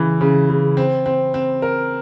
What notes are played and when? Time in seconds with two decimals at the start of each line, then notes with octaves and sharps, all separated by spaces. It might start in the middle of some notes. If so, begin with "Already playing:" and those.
Already playing: C#3 E3
0.21 C#3
0.50 C#3
0.77 C4
1.06 C4
1.34 C4
1.62 A#4